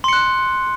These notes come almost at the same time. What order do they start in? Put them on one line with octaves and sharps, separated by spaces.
C6 C#7 F#6